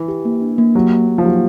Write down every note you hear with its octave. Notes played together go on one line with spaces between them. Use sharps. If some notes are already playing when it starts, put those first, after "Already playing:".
Already playing: E3
G4
A#3
D4
A#3
F#3 G4
A#3
A#3
F3
F#3 G4